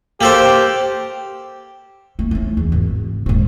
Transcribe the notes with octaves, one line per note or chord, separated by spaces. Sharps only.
A#3 G4 A4 C5
A3
A3 C#4
E2
G#1
D#1 G#2